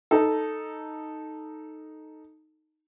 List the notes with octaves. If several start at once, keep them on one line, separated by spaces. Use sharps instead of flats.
D#4 A4